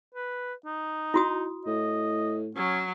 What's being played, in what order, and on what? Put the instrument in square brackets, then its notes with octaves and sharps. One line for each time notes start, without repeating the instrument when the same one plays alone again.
[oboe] B4
D#4
[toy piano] E4 F#4 D#6
[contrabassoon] A2 [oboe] D#5
[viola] F#3 [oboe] C#4